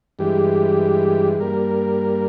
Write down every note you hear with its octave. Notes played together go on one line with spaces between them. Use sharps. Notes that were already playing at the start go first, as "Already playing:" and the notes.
G2 E3 G#3 G4
G2 G3 A#3 A#4